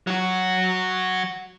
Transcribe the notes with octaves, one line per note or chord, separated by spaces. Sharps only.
F#3 F#4